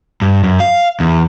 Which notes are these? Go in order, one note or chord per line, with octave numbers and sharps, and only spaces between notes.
G2
F#2
F5
E2